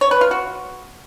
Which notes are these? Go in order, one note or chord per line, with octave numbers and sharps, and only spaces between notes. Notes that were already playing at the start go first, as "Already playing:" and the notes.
C#5
B4
F4
F#4